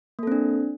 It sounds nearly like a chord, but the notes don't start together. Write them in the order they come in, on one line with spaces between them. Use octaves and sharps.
A#3 A4 C4 D4